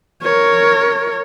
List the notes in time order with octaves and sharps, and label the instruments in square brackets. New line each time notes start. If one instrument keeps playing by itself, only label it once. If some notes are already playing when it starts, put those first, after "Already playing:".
[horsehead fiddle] A#4 C#5